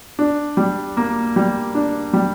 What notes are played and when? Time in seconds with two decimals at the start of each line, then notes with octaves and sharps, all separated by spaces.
0.19 D4
0.57 G3
0.97 A#3
1.36 G3
1.75 D4
2.14 G3